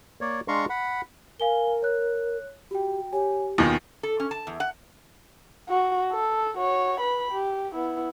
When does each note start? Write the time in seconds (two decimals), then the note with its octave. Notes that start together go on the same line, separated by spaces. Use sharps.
0.21 A#3 C#5 D5
0.48 G#3 D4 F5 A#5 C6 C#6
0.70 F#5 B5
1.40 A#4 F5 G#5 G7
1.82 C#5 F#6
2.71 F#4 G4 G5
3.13 G4 C#5 G#5
3.58 D#2 B2 D#3 F4 G#5
4.03 A4
4.20 C#4
4.31 A5
4.47 E2
4.60 F#5
5.69 F#4
6.12 A4
6.58 F#4 C#5
7.00 B4 B5
7.31 G4
7.74 B3 E4